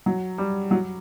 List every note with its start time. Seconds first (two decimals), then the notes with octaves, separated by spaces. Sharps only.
0.06 F#3
0.38 G3
0.71 F#3